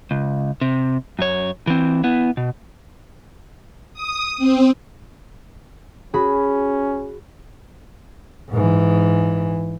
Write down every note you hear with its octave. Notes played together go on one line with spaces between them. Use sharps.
C#2
C3
F#2 C#5
E3 C4
B3 E4
B2
D#6
C4
C#4 F#4 G#4 B5
G#2 E3